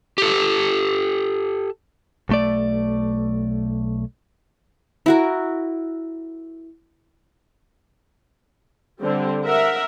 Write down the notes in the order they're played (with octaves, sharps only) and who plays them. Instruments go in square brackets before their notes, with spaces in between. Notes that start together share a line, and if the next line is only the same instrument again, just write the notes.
[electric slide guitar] G4 A4
[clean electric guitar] B1 A3 D5
[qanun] E4 F#4 A#4
[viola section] D3 G3 C4
A#4 E5 F#5